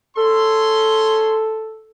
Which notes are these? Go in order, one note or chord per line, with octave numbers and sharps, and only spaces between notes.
C#4 A4 C6